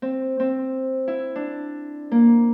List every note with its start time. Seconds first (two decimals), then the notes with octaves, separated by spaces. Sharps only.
0.02 C4
0.40 C4
1.08 E4
1.36 D4
2.11 A#3